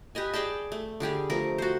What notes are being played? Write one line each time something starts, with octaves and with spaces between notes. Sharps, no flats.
G4 B4 D#5 G#5
G#4 D5 G5 A5
A3
D3 G3 G4 G#4
F3 A3 A#4
F#4 C5